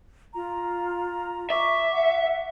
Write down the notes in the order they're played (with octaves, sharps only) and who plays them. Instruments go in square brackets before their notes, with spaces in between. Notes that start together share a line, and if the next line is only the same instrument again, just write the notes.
[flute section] F4 A#5
[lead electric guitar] E5 [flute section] C#6 D6
[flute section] F#5